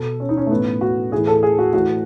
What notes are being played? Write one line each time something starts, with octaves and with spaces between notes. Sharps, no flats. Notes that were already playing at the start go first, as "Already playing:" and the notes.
Already playing: B2 A4
C#4
D#4
C#4
A3
A2 E3 B3
F#4
A2 E3 G#4
A4
G#4
F#4
A2 E3 F#4